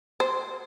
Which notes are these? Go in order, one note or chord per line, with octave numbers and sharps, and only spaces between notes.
C5